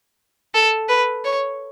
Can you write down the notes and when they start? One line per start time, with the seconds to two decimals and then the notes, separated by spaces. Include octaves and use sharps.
0.54 A4
0.89 B4
1.25 C#5